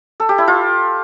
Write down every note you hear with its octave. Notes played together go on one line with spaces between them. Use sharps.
A4
G4
E4
F4